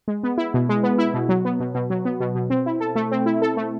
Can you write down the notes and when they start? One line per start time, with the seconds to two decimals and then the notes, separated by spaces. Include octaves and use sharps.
0.08 G#3
0.23 B3
0.38 E4
0.54 B2
0.69 G#3
0.83 B3
0.98 E4
1.14 B2
1.29 F#3
1.45 B3
1.60 B2
1.75 B2
1.90 F#3
2.05 B3
2.20 B2
2.35 B2
2.50 C4
2.66 E4
2.80 A4
2.96 A3
3.11 C4
3.26 E4
3.42 A4
3.57 A3